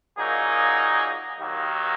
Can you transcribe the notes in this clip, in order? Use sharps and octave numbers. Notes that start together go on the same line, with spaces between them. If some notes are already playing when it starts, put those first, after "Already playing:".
A#2 F#3 A#3 D#4 G#4
D#2 D#3 F#3 A#3